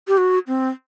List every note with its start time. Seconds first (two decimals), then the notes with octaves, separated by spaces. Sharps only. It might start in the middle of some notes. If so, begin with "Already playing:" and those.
0.08 G4
0.17 F#4
0.48 C4